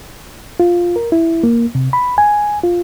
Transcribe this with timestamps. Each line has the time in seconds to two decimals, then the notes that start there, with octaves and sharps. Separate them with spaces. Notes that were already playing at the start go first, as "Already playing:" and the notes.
0.60 F4
0.96 A#4
1.12 E4
1.44 A#3
1.75 C3
1.93 B5
2.18 G#5
2.64 F4